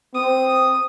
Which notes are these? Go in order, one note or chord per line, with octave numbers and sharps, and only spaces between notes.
C4 D#6